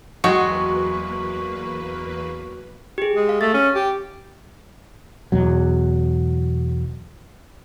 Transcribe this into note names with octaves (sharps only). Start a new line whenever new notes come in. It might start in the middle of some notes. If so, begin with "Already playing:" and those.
E2 F#3 G#3 A#3 F#4 B4 G5 C#6
G4 G#4
G#3
F5
A3 A6
C#4
G4
E2 B2 F#3